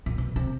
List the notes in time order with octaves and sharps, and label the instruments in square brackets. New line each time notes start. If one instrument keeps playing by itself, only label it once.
[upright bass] A#2
B2
C3